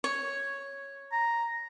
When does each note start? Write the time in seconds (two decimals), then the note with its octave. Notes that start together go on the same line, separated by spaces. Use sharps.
0.04 C#5
1.12 A#5